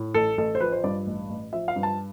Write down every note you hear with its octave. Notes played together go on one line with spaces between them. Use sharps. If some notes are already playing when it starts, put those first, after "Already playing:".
Already playing: A2
A1 A4
A1 A4
C5
F3 B4
C5
G2 D5
A1
A1
F3 E5
F5
G2
A5